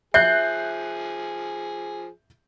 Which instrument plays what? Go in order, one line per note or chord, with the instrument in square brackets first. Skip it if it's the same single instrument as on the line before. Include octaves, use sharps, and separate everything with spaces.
[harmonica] F3 G#4 [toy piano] E5 [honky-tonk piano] F#6 G6 C7